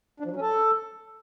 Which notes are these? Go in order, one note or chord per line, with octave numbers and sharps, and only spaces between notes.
D4
F3
F#3
C#4
A4